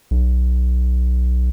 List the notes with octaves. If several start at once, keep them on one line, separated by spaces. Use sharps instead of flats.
B1